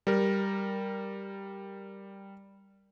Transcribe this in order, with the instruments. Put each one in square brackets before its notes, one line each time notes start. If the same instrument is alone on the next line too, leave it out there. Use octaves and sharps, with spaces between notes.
[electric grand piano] G3 A#4